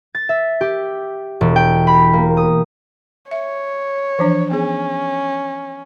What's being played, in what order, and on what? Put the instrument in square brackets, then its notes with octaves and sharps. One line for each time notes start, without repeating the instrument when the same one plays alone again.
[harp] A6
E5
G4
E1
G5
B5
A#3
D#6
[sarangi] C#5 [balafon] E5
[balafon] E3 F3 D4
[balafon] B3 G#4 [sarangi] C#4